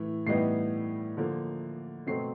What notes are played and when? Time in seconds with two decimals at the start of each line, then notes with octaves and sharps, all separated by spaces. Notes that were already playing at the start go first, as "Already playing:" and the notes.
Already playing: A2 E3
0.27 A2 E3 G3 B3 D#4 C7
1.17 D3 F3 A#3
2.07 B2 F#3 A3 C4 C7